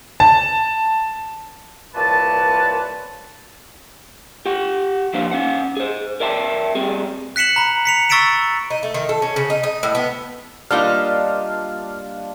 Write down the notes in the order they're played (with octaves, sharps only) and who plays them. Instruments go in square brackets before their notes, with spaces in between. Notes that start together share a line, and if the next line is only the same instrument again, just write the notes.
[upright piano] A5
[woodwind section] C2 A#2 A3 B4 C#5 A5
[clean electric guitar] G4 F#5
F3 A#3 D4 G4 C5 F5
C#4 F5 F#5
G#4 C5
A#4 D5 E5 G5 A5
G3 C4 G#4
[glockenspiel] F#6 B6 C#7 E7 F#7
A#5 B5
B6 C#7 F7
C#6 E6 A6 B6 D7 E7
[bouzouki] D#4
A3
D#3
A4
C#4
C#3
D#4
D#4
A2
B3
[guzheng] G3 A#3 [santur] D4 F4 [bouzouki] D#4 D#5 E5 [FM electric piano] F6